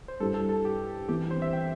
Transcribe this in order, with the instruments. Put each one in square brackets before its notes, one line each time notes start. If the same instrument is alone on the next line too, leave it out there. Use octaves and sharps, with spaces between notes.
[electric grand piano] C5
[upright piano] G2 G3 E4 G4 [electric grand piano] A4
[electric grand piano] A4
A4
G4
[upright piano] E3 C4 E4 [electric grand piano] G4
[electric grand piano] C5
E5
G5